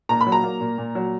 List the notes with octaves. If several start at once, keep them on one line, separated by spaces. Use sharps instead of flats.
A#2 A#5
B5
F#3
A#5
A#3
A#2
A#2
F#3